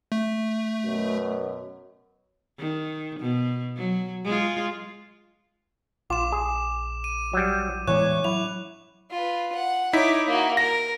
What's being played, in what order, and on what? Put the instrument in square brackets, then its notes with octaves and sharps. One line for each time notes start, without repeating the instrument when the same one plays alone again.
[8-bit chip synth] A3
[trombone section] F#2 B2
[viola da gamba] D#3
B2
F#3
G#3 F4
[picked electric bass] A#1 [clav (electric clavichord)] F4 [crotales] D6 E7
[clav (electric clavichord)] G#4
[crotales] D#7
[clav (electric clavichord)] F#3 G3
[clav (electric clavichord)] E2 [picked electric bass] A2 E3 G#3 [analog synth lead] C#5 [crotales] D6 F#6
[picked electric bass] F#3 [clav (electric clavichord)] E4 [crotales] F7
[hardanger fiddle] F4 B4
F#5
[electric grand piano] D#4 E4 B6 [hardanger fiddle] C#5 D6
[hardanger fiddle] A#3 F#4
[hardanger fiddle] A#4 [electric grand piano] A#6